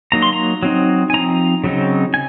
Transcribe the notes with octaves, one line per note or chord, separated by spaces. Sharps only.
F#3 A#3 D#4 A#5
C6
A#5
F#3 C4 D#4
G#5
F3 C4 D#4 A#5
C#3 F#3 C4 D#4
G#5